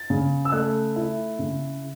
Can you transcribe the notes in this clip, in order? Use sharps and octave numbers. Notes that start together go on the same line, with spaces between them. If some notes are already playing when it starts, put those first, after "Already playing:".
Already playing: A6
C#3
E6
A3 F#6
E4
C#3